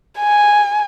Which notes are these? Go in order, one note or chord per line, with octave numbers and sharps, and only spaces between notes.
G#5